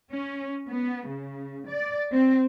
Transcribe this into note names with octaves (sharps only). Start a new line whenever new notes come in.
C#4
B3
C#3
D5
C4